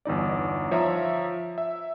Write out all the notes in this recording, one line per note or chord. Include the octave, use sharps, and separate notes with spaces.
G1 E2 D#4 D5
F3 C#5 E5 A#5
E5